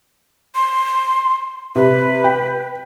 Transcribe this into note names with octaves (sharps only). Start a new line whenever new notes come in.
C6
C3 B4
G5